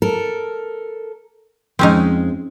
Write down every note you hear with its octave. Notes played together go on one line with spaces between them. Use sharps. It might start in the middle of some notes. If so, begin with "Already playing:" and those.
A4 A#4
F2 G#3 C4 C#4 D#4